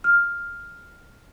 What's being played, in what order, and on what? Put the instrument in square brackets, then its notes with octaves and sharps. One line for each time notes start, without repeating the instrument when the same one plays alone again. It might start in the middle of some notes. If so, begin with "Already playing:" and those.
[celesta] F6